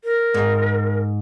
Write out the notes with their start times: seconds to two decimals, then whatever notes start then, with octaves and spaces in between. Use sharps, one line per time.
0.04 A#4
0.34 G#2